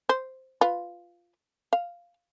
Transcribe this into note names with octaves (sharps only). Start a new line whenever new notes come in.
C5
F4 B4
F5